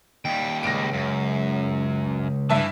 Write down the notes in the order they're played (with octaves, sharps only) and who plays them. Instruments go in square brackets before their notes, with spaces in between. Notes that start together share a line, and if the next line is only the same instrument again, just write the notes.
[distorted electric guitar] D#2 G3 [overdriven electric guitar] G5
[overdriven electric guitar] C#2 [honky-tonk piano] A#6 D7
[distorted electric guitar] F#2
[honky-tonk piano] G2 E5 A5 [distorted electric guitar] E3